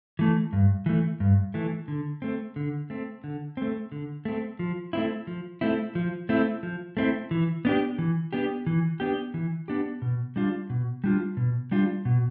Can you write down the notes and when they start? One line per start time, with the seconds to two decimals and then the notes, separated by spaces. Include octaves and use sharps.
0.19 E3 A3
0.53 G2
0.86 E3 A3
1.20 G2
1.54 E3 A3
1.88 D3
2.22 A3 C4
2.56 D3
2.90 A3 C4
3.24 D3
3.57 A3 C4
3.92 D3
4.25 A3 C4
4.59 F3
4.93 A3 C4 E4
5.27 F3
5.61 A3 C4 E4
5.95 F3
6.29 A3 C4 E4
6.63 F3
6.97 A3 C4 E4
7.31 E3
7.65 B3 D4 G4
7.99 E3
8.33 B3 D4 G4
8.67 E3
9.00 B3 D4 G4
9.34 E3
9.68 B3 D4 G4
10.02 B2
10.36 G3 D4 F4
10.70 B2
11.04 G3 D4 F4
11.37 B2
11.71 G3 D4 F4
12.05 B2